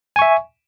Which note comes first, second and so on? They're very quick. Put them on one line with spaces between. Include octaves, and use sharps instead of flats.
G#5 C#6 E5